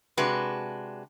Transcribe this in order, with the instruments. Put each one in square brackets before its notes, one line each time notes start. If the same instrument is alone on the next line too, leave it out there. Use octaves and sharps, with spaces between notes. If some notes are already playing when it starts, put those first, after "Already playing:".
[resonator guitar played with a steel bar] C3 G#3 D4 F#4 B4